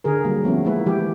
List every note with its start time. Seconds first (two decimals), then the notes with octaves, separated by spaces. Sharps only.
0.04 D3 G#4 A#4
0.24 F#3 G3 A#3
0.44 F3 A3 B3 C#4
0.65 G#3 A#3 E4 B4
0.86 E3 G#3 G4
0.99 A3